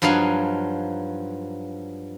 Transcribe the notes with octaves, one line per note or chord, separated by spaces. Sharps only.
G2 F3 F#3 D#4 F5 G#5